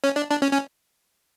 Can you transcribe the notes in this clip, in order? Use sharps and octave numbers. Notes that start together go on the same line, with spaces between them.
C#4
D4
D4
C#4
C#4